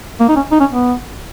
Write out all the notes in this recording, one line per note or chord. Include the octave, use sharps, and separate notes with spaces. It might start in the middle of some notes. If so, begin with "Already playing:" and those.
A#3
D#4
C#4
D#4
C#4
B3